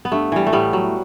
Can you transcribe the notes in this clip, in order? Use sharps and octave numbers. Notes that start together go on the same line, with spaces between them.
B3
G2 A3
E3 G3
A3
A2 G3 B3
F#3